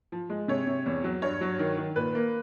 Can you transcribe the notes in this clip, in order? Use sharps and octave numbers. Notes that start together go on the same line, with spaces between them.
F3
G#3
C3 C#5
C3
E2
F#3
G2 C#5
F#3
D#3
D#3
A#2 B4
A#3